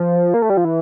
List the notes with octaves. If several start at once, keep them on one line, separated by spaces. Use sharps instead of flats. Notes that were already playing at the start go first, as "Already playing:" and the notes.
Already playing: F3
A#3
A3
G3
F3
E3